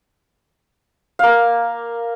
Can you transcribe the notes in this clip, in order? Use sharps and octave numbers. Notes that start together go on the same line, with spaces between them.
A#3 F5